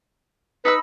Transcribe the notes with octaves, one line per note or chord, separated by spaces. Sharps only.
D#4 B4 B5 E6